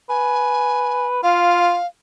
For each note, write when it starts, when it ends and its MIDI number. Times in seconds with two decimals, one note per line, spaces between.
0.09 1.21 71
0.09 1.07 80
1.23 1.76 65
1.23 1.86 77